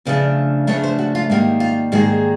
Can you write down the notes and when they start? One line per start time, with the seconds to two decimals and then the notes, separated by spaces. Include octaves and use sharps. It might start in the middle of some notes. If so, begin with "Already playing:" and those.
0.05 D2 C#3 F3 A3 D4 D5
0.67 D2 C#3 F3 A3 D4 C#5
0.83 C5
0.99 F#4
1.15 F4
1.30 G#2 D#3 G3 A#3
1.60 F4
1.92 G#2 D#3 G3 A#3 G#4